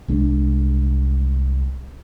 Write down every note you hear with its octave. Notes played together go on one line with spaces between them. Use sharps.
C2 G#3 D4